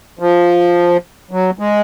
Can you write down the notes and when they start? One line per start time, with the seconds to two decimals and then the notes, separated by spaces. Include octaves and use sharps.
0.19 F3
1.31 F#3
1.59 G#3